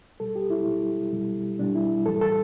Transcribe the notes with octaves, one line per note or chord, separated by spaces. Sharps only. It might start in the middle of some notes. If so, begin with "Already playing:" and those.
B2 G3 A4
G4
E4
B2 G3
B2 G3
B2 G3 D4
E4
A2 E3 G3 A4
A4